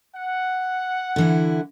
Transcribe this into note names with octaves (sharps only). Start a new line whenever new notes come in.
F#5
D3 E3 E4